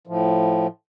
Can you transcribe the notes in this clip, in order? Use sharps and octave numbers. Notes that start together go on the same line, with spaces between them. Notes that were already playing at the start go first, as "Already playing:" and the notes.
A2 F3